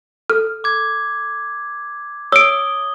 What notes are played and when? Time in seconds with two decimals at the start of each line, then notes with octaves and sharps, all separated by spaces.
0.30 A4 F6
0.64 D6 G#6
2.32 C#5 D#6 E6 D7 G7